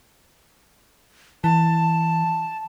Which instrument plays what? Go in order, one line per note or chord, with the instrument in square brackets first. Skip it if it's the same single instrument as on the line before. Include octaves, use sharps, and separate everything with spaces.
[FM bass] E3 [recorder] A5